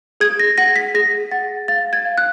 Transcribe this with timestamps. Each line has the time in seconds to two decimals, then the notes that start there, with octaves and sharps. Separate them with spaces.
0.20 G#4 G#6
0.40 A#6
0.58 F#5 A#6
0.76 B6
0.94 G#4 A#6
1.31 F#5 A6
1.68 F5 A6
1.93 G#6
2.05 F5
2.18 F#6